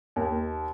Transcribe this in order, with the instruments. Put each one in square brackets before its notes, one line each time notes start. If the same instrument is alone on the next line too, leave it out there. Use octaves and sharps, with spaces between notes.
[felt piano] D#2